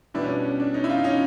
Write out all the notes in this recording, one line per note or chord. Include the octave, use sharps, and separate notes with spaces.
B2 G3 B3 D4 E4
C#4
D4
C#4
D4
C#4 D#4
E4
D#4 F4
C#4 D#4